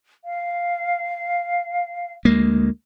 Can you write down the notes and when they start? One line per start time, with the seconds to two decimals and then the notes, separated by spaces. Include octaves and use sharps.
0.25 F5
2.25 D2 G#3 A#3